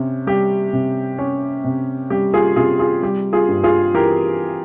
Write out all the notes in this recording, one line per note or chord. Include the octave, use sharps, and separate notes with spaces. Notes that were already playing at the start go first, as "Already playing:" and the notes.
Already playing: C3 C#4
G3 G4
C3
C#4
C3
G3 G4
F4 G#4
C3 F4 G#4
F4 G#4
G3 G4
F4 G#4
G2
F4 G#4
E3 G4 A#4